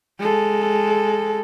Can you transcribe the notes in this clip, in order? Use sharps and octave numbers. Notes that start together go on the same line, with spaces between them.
G#3 A4